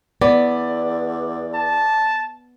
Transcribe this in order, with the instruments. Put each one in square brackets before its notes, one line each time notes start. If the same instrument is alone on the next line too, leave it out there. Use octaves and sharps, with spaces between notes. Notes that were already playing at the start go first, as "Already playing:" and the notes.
[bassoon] E2 [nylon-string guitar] B3 [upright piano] D5
[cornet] A5